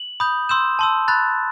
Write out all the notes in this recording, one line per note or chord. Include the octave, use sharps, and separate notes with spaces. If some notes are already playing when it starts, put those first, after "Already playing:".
Already playing: F#7
B5 D#6 G6
C6 E6 G6 E7
A5 C6 E6
B5 F#6 A6